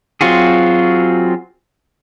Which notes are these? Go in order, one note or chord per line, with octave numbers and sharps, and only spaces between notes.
F#3 C4 F4 F#4 G#4